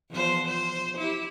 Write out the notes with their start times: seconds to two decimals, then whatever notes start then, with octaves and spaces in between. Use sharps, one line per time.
0.10 E2 F3 C5
0.47 C5
0.98 E4 G4